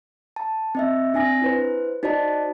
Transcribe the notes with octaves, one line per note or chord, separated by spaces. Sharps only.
A5
C4 D#5 E5
C4 D4 G#5 A#6
E4 B4 C5
D#4 F#4 C5 D5 D#5 A5